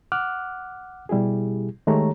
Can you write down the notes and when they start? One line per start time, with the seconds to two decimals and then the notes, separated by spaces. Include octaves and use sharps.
0.12 F#5 D6 F6 F#6
1.09 B2 G3 E4 G4 G#4
1.87 D#3 G#3 A3 G4 C#5 A#5